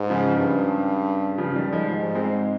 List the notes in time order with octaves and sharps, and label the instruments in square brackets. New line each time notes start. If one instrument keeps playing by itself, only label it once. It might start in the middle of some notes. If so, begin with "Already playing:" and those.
Already playing: [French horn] G#2
[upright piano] C#3 F3
[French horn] G2
[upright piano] C#3 F3
D#3 G3
F3 G#3
[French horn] G#2
[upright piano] G#3 C4